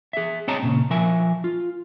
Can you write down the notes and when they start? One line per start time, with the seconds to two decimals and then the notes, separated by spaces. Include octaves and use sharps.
0.13 G#4 E5
0.48 C4 C#5 D#5 A5 A#5
0.63 A#2 C#3
0.90 F3 A#4 E5 G#5
1.44 F4